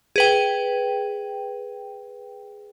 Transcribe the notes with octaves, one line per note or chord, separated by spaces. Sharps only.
G#4 B4 G5